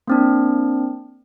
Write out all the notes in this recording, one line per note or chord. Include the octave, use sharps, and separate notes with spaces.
A#3 C4 D4